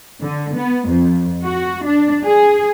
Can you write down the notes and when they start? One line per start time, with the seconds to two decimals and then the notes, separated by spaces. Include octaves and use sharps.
0.22 D3
0.56 B3
0.88 F2
1.44 F#4
1.86 D4
2.25 G#4